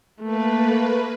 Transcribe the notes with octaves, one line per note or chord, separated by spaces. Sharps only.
A3 A#3 B4